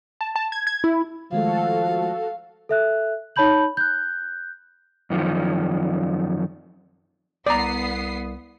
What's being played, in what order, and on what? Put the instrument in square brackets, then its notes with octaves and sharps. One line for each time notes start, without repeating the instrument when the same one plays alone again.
[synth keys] A5
A5
G#6
G#6
E4
[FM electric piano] D#3 G#3 A3 [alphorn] F3 [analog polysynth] F#4 A4 [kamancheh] F5
[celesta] A4 E5 F#6
D#4 C#5 A5 B5 G6 F#7
F#6 G6
[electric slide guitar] F#2 D#3 F3
[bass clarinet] C2 [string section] B3 D#6 C7 [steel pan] D5 A#5